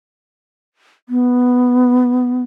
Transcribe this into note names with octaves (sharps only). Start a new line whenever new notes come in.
B3